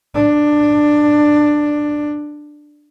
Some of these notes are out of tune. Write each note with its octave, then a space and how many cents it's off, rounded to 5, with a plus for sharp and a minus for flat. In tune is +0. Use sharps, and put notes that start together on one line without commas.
D4 +10